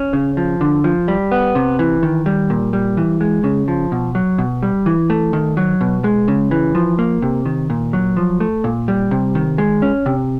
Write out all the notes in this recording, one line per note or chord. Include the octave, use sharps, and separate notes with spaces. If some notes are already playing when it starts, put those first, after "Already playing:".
Already playing: C#4
C#3
F3
D3
F3
G3
B3
C3
E3
D#3
G3
A#2
G3
E3
G#3
C#3
F3
B2
F#3
B2
G3
E3
A3
D#3
F#3
B2
G#3
C#3
E3
F3
A#3
C3
D#3
A#2
F#3
F3
A3
A#2
G3
C3
D#3
G#3
C#4
C3